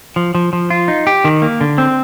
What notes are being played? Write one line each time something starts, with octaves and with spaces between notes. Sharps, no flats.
F3
F3
F3
F4
D#4
G4
D#3
A#3
D3
C4